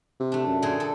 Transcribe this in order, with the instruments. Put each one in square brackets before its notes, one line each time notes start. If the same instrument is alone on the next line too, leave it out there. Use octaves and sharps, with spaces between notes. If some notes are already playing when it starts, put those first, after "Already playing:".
[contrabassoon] C3
[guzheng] A3 D4
[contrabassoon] F#2
[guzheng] A#2 D3 G#4
A4